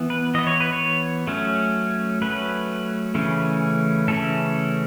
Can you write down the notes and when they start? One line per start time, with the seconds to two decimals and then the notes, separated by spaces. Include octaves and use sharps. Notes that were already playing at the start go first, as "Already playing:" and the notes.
Already playing: E3 B3
0.10 B4
0.34 E3 B3 D#5
0.47 C#5
0.60 B4
0.72 C#5
1.27 F#3 A3 C#4
2.22 F#3 A3 C#4 B4
3.15 C#3 E3 A3 C#4
4.08 C#3 E3 A3 C#4 A4